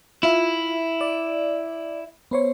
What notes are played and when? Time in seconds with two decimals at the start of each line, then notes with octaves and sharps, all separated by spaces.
0.23 E4 F4 E5
1.01 D5
2.31 B3 C5 C#5